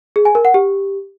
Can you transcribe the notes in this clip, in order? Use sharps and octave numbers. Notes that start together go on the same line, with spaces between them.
G#4
G#5
A#4
F#5
G4